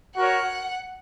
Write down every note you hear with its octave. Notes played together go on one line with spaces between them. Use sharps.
F#4 A#4 C#5 F#5